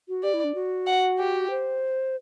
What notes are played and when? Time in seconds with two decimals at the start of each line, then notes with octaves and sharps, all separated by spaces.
0.08 F#4
0.23 G4 D5
0.34 E4
0.44 D4
0.55 F#4
0.87 F#5
1.18 G4
1.50 C5